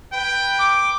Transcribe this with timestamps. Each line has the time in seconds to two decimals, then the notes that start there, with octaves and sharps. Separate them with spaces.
0.13 B4 G5
0.59 D6